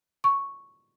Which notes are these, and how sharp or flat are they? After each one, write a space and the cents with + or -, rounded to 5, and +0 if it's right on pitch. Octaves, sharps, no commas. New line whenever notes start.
C#6 +0